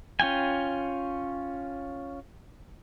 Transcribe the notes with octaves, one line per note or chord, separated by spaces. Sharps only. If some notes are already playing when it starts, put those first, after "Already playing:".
C#4 F4 G5 G#5